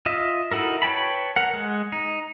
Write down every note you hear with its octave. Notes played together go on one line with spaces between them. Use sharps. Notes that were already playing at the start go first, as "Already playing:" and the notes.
F4 D#5 E5
D#4 E4 F#4 A4 A#4
B4 C#5 G5 A5 B5
A#4 F#5
G#3 F#6
D#4